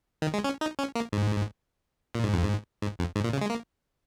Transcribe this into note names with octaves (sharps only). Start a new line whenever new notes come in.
D#3
G#3
C#4
D#4
C#4
A#3
G#2
A#2
G#2
F2
G#2
G#2
F2
G#2
A#2
C#3
G#3
A#3